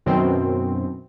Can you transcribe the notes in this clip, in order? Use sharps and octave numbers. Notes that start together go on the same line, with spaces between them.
F#2 B2 D#3 C4